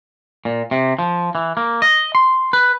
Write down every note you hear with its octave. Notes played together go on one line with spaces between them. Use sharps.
A#2
C3
F3
E3
A#3
D#5
C6
B4